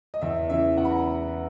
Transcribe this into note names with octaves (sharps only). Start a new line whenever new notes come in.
D#5
E2 E5
C#3 E3 E5
E2 F#5
B5
A#5